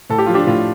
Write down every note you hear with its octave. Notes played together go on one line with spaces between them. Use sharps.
A2 A4
G4
F3 F4
D4 G4
A2 F4